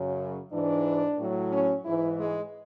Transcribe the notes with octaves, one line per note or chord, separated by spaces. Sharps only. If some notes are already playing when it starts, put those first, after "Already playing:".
Already playing: F#2 C#3 F#3
G#2 E3 D4
A2 F#3
C#4
G#2 E3 E4
G#3